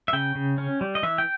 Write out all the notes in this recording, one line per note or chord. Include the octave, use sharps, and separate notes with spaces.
E5
C#3 G5
C#3
C#4
G3
D#5
E3 E5
G5